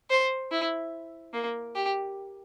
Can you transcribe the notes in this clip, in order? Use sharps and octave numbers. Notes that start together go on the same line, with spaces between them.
C5
E4
A#3
G4